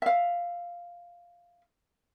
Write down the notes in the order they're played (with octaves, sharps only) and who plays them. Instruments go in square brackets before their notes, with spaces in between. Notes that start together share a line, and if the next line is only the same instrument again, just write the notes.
[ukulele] E5 F5